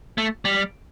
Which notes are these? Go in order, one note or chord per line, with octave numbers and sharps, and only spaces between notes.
A3
G3